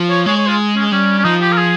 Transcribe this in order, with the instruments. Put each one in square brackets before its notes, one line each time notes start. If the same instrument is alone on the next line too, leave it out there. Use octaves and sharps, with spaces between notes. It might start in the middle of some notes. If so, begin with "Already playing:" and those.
Already playing: [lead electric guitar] F3
[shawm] C#5
[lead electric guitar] G#3 [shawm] C#5
[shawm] C#5
F4
C#4
[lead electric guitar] G3 [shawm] C#4
[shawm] C#4
[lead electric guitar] F3 [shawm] D#4
[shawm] G4
A#4
G#4